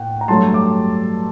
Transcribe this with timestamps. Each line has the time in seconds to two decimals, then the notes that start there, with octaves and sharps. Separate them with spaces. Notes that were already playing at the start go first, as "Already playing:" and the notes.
Already playing: A2 A#3 F#5 G5
0.21 A#5
0.28 G2 F#3 A3 A5 C6
0.54 D6